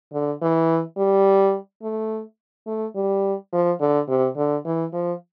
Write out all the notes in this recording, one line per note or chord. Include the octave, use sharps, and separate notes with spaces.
D3
E3
G3
A3
A3
G3
F3
D3
C3
D3
E3
F3